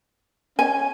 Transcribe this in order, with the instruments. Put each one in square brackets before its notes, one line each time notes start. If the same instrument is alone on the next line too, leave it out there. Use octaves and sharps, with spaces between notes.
[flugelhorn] C#4 [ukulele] G#5